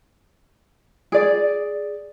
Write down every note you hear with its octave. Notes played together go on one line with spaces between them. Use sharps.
G#4 D5